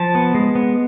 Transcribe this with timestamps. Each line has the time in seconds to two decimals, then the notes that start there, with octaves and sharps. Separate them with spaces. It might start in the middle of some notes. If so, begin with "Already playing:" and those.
Already playing: F3 A5
0.15 B3
0.35 G#3
0.55 B3